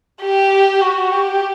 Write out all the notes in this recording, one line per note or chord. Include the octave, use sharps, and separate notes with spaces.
G4
F#4
G4